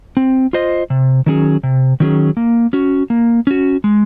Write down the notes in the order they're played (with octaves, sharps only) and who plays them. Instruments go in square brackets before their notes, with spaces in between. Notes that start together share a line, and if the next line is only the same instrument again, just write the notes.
[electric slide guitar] C4
F4 C5 D#5
C3
D#3 F#3 C#4 G#4
C3
D#3 F#3 C#4 G#4
A#3
C#4 F#4
A#3
C#4 F#4
G#3